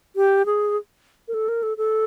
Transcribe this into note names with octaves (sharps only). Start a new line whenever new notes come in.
G4
G#4
A#4
A4
A#4
A4
A4